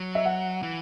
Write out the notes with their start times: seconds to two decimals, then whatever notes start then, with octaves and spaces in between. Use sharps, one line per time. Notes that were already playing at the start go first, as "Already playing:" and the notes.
Already playing: F#3
0.15 E5
0.25 F#5
0.63 E3